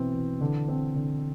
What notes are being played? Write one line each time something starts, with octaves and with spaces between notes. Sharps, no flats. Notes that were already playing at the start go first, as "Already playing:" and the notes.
Already playing: B2 E3 C4
E3
D3
C4
D3